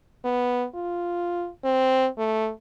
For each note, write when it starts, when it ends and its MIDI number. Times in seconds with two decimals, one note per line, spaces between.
0.25 0.66 59
0.75 1.49 65
1.65 2.08 60
2.18 2.51 57